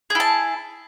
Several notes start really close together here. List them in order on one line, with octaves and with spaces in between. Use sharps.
G#4 E4 A5